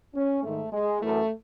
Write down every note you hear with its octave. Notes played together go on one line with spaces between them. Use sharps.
C#4
G#2 D#3 A3
G#3
F#2 E3 A3